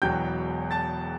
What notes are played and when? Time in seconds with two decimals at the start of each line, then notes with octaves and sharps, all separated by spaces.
0.02 E1 E2 B2 F#3 G5 G6
0.71 A5 A6